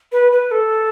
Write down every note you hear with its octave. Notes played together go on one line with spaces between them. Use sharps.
B4
B4
A4